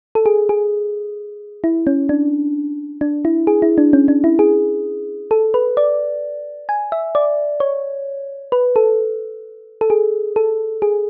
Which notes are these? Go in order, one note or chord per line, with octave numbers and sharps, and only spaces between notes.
A4
G#4
G#4
E4
C#4
D4
D4
E4
G#4
E4
D4
C#4
D4
E4
G#4
A4
B4
D5
G#5
E5
D5
C#5
B4
A4
A4
G#4
A4
G#4